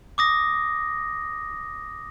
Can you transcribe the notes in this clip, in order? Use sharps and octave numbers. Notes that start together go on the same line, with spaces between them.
D6 D#6 A#6